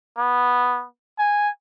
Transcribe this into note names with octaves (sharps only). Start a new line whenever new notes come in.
B3
G#5